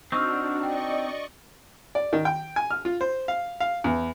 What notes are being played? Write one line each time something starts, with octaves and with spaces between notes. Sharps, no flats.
C4 D4 D#4 F#4 C#6 E6 F6
D5 D#5 G5 C#6
D5
D#3
G5
G#5
F6
F4
C5
F5
F5
E2